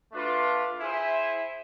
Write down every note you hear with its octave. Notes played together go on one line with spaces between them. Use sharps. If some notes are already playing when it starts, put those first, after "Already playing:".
A3 D4 F4 B4
E4 G#4 C5 E5